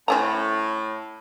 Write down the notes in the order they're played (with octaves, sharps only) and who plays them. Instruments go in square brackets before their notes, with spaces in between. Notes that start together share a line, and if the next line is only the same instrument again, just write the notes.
[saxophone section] A2 [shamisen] C4 C#4 A#5